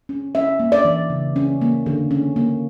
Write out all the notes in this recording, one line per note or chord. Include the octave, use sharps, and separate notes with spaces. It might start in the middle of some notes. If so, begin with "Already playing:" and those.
C#4
C#4 E5
A#3
D5
E3
C#3
C#4
A#3
D3
C#4
A#3